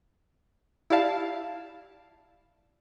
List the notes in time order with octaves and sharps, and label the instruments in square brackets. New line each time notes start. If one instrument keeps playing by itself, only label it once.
[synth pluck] E4 G4 D5 F5 A5